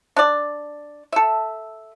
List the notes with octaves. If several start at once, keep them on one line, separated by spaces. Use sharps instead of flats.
D4 D5
A4 E5